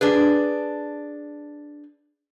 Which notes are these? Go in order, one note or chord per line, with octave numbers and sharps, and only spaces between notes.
D4 G#4 B4